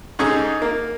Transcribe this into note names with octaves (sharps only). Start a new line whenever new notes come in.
G#2 D3 C#4 D#4 G#4
A#3